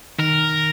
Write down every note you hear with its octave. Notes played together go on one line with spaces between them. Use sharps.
D#3 A#4